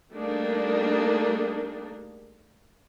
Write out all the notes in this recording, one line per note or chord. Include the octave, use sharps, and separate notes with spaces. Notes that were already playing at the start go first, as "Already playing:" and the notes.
G3 A3 A#3 D4 D#4 G#4